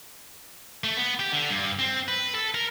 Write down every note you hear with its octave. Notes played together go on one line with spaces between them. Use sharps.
A3
B3
G4
D3
G2
C4
B4
A4
A#4